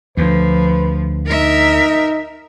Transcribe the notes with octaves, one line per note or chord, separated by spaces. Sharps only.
D2 F3 B4
D#4 A#4 E5